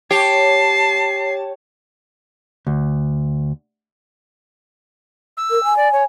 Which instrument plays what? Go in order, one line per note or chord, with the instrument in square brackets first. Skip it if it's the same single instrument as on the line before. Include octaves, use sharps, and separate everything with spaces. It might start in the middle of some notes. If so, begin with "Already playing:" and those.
[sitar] G4 [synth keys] C#5 [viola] A5 [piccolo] C7
[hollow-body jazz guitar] D2
[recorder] E6
[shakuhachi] A#4
G#5
[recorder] D5
C#5